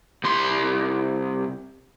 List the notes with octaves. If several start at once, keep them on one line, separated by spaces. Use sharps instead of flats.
C2 C6